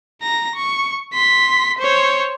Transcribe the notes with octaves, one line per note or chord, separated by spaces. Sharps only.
A#5 A#6
C#6
C6 B6
C5 C#5